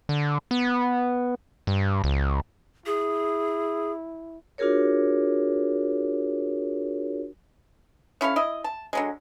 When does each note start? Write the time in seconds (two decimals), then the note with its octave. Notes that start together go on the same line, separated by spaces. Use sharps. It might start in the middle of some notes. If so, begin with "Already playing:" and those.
0.09 D3
0.51 B3
1.67 G2
2.04 C#2
2.86 E4 G#4
4.58 D4 F4 F#4 G#4 A#4 C#5
8.21 C#4 E4 A4 F5
8.36 E4 D#5
8.64 A5
8.93 D3 F#3 G#3